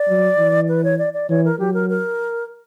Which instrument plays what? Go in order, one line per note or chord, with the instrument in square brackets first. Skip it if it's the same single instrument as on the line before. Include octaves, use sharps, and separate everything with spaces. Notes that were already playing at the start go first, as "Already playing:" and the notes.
Already playing: [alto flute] D5
[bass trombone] F#3
E3
[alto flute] B4
C#5
D5
D5
[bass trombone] E3 [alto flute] C#5
[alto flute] A#4
[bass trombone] F#3 [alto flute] G4
[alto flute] A#4
A#4